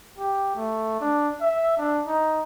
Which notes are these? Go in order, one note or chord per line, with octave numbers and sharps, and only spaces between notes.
G4
A3
D4
E5
D4
D#4